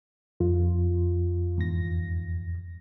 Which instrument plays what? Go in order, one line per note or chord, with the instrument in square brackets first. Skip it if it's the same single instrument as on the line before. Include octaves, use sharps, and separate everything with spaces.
[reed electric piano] F2 [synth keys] F4
[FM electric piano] E2 G#2 A#6